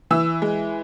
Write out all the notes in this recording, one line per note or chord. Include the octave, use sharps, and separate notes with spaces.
E3 E6
G#3